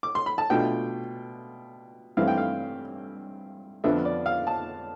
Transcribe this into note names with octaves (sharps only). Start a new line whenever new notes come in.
D6
C6
B5
A5
B2 A3 D4 F4 G5
G2 E3 A3 C4 E4 F5
G5
F5
F2 D3 F3 B3 D4 E5
D5
F5
A5